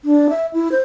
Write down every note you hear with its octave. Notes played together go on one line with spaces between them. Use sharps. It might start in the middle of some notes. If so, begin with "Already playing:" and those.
D4
E5
E4
C5